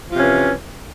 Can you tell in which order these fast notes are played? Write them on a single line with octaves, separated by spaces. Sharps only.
F3 F4 C3 C#4 E3